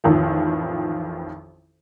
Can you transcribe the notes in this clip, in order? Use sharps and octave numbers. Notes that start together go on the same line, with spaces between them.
A1 F2 D#3 F3